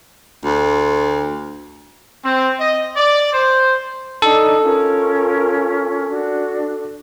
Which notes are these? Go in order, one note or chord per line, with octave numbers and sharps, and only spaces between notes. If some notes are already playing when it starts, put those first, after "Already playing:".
D2
C4
D#5
D5
C5
D4 D#4 A4
C#4 F4 A#4
D4 F#4